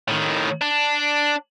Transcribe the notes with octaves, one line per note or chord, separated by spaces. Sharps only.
A2 D#3
D4